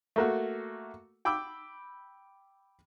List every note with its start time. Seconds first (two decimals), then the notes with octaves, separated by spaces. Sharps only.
0.16 A3 A#3 F#4
1.25 G5 B5 D6 E6